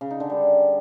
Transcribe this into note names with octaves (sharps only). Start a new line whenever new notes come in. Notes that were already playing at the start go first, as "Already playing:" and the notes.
C#3
D#4
D3
G3